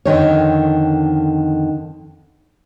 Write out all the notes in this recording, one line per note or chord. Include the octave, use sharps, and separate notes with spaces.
F2 D3 D#3 C#5